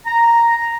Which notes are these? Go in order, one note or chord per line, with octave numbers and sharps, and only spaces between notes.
A#5